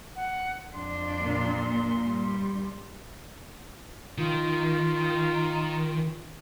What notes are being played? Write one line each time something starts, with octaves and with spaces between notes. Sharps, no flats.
F#5
F2 D4 C6
A#2
G2 G3
D#3 F4